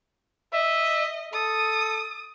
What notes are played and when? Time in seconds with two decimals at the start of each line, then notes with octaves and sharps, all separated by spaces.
0.53 D#5 E5
1.33 A4 D#6